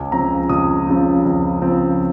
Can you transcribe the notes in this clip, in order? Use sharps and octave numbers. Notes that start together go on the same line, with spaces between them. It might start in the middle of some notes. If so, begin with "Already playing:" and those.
Already playing: C#2 G#5
C#3 F3 C4 A#5
C#2 D#6
C#3 F3 C4
C#2
C#3 F3 C4